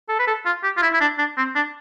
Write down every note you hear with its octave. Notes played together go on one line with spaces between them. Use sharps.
A4
B4
A4
F4
G4
F4
E4
E4
D4
D4
C4
D4